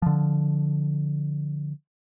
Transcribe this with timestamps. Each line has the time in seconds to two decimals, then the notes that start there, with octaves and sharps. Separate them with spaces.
0.02 D3 F3